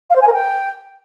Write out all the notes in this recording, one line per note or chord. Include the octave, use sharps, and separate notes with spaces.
F5
C5
G#5
A#4
G5